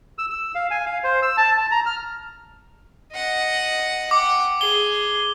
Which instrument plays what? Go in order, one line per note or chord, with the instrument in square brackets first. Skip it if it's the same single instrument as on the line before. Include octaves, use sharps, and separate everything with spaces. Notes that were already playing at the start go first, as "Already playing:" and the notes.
[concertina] E6
E6
F5
G#5
F5
C5
E6
A5
A5
A#5
F6
[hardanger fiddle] D#5 F#5
[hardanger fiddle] F#5 G5 [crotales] D6
[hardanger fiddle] G#4 [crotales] G7